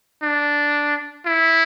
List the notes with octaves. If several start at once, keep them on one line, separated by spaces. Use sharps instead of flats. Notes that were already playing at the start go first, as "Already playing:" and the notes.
D4
E4